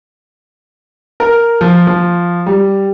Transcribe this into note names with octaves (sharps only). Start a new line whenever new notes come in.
A#4
F3
F3
G3